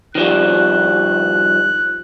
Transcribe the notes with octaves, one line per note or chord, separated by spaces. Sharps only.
D#3 F3 G3 F#6